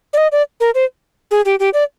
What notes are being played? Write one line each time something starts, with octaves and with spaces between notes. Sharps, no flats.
D5
D#5
D5
A#4
C5
G#4
G4
G4
D5